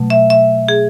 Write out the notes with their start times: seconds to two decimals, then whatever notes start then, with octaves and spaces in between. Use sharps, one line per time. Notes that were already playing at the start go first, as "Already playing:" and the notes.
Already playing: B2 F#3 A3
0.10 E5
0.30 E5
0.68 G#4